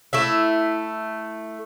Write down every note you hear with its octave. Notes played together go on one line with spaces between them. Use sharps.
A3 E4 E5